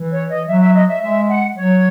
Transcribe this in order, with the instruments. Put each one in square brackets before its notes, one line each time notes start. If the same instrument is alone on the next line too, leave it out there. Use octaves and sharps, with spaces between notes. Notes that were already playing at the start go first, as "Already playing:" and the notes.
Already playing: [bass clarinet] E3
[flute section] C#5
D#5
[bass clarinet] F#3 [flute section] E5
[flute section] E5
D#5
E5
[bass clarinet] G#3 [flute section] E5
[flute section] F#5
[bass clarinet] F#3 [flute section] C#5